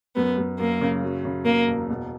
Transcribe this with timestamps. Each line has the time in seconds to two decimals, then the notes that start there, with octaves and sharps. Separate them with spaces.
0.16 F#2 B3
0.38 F#2
0.59 F#2 A#3
0.81 C#3
1.03 F#3
1.25 C#3
1.45 C#3 A#3
1.67 E1
1.90 B2